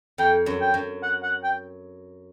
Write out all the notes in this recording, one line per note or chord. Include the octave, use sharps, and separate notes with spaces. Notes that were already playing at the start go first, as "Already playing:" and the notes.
F2 G5
F#2
G5
F#2
F#5
F#5
G5